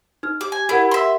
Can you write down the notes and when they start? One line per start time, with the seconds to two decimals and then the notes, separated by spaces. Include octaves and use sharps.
0.23 D#4 F6
0.41 G4 D6
0.52 G#5
0.69 E4 G4 A#4 F#5
0.91 E5 C6